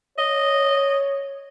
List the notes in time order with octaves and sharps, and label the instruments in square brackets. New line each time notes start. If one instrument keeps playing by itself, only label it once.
[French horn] C#5 [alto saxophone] D#5